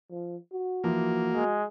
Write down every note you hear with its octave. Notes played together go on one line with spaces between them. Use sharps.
F3
F#4
E3 F3 A#3
G#3 G#4